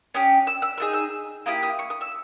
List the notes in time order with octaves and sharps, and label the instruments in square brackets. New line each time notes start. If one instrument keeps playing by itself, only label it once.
[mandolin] C#4 G4 D#6
E6
E6
B3 D#4 G#4 E6
E6
A#3 E4 G4 D#6
D#6
C#6
D#6
E6